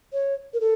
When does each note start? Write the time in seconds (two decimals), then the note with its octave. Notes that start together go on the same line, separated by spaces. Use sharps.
0.13 C#5
0.54 A#4
0.61 A4